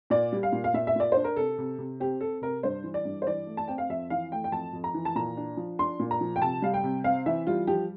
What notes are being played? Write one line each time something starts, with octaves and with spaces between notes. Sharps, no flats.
A#2 D5
G3
F5
A#2
F5
A#2 E5
E5
A#2 D5
D4 C5
A#4
C3 A4
C3
C3
C4 G4
C4 A4
C3 A#4
G2 C5
E3
D5
G2
C5
E3 D5
A3
A5
C4 G5
F5
F2 E5
E3 F5
A3 G5
G5
F2 A5
F2
A#5
E3
A5
A#2 A#5
D4
F3
D4 C6
A#2
A#5
F3
G5
C3 A5
G3 F5
G5
C3
C4 F5
E3 E5
G3 F4
F3 G4